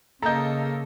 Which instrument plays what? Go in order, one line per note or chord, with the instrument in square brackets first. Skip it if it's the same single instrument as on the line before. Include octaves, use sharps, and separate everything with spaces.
[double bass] C#3 [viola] A#3 [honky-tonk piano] A4 D#5 [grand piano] A#5 G6